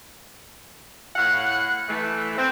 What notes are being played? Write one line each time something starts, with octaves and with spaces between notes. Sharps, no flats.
A2 F5 F#5
E3 A3
C4